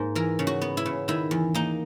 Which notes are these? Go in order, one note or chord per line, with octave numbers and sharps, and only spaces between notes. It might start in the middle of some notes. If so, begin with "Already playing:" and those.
Already playing: G#2 A#3
E3 A#4
C#3
F#4
B3
E4
C#3
D#3 E4
E2
A#3 D#4